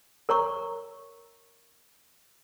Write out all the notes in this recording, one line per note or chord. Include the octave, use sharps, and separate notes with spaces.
A#4 C#5 A#5 C#6